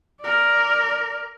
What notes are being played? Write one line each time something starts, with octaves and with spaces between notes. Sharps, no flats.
A#4 D5